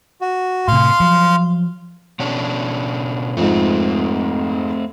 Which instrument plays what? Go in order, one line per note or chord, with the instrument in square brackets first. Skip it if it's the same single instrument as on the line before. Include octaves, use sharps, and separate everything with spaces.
[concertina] F#4
[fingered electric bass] A2 C3 [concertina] F5 C6
[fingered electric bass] F3 F#3
[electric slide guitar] B2 C#4 D4
[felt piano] F2 G#2 [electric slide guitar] A3 C4